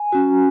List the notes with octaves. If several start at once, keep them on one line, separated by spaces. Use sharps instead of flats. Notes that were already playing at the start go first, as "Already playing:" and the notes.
Already playing: G#5
C#4 F#4